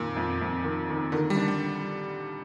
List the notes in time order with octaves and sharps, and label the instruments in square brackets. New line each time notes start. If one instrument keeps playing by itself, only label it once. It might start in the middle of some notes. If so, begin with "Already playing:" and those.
Already playing: [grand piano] F2 D#3 [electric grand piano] A#2
[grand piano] F2
F2
D#3
D#3
[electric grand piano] D3 [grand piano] D#3
[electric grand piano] G3
[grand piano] D4
[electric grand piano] G3